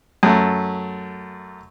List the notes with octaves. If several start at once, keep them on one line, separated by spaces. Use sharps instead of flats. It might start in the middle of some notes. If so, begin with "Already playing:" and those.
F#2 A3